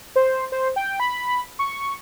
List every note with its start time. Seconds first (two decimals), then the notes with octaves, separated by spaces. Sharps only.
0.16 C5
0.52 C5
0.76 G5
1.00 B5
1.59 C#6